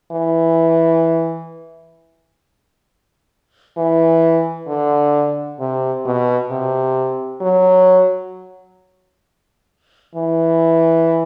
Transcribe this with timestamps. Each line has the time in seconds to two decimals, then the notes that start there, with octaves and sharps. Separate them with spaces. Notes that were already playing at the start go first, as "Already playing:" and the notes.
0.12 E3
3.77 E3
4.67 D3
5.60 C3
6.06 B2
6.51 C3
7.41 F#3
10.16 E3